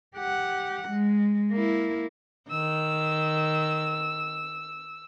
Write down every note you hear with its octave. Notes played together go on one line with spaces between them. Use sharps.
G4 F#5
G#3
A#3 E4
D#3 E6